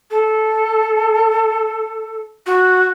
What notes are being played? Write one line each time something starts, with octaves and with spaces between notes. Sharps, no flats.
A4
F#4